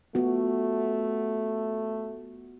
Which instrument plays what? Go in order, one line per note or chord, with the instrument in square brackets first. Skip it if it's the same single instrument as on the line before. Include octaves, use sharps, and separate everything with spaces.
[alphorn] A3 [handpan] B3 F4 F#4